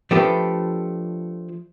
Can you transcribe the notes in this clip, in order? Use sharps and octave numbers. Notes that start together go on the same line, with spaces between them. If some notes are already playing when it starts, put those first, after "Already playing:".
F3 A3 D4 G4 A4 B4